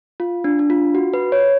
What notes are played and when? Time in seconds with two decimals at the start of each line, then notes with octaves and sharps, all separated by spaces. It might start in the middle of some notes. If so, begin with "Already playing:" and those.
0.20 F4
0.44 D4
0.59 D4
0.70 F4
0.95 F#4
1.14 B4
1.32 C#5